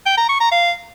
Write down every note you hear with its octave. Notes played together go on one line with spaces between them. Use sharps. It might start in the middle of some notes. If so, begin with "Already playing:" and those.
G5
A#5
C#6
A#5
F5